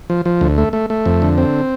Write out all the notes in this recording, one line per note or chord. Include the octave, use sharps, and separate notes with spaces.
F3
F3
D2
A3
A3
A3
F2
D3
C4